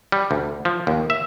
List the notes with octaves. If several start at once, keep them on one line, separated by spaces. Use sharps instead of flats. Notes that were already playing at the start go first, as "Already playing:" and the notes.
G3
D2
F3
D#2
E5